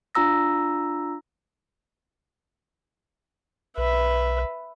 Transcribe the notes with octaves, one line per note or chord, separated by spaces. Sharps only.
D4 F4 A#5 E6 A#6
B1 B4 E5